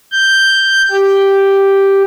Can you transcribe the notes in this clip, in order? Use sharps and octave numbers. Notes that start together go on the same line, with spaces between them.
G6
G4